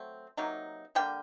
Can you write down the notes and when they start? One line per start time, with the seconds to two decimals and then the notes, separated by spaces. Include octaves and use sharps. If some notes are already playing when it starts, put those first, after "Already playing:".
Already playing: F#3 A3 C4
0.37 C3 F#3 A#3 D#4
0.95 D3 G3 A#3 G5